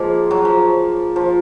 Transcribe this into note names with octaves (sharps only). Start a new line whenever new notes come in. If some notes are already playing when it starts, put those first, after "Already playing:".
Already playing: F3 G#3 A#3
F#3
F3
F3